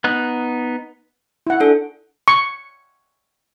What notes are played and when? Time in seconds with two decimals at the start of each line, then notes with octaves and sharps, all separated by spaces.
0.04 B3 D#4 F#6
1.47 E4 F#5
1.60 D4 A4
2.28 C#6